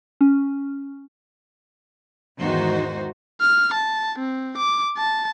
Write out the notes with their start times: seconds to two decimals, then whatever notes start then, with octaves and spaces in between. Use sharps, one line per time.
0.21 C#4
2.39 E2 G#2 D#3 D#4 F#4 C5
3.41 F6
3.73 A5
4.18 C4
4.57 D6
4.97 A5